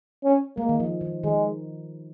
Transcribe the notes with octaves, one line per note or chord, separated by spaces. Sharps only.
C#4
G#3 A#3
D#3
F3
D#3
D#3 G#3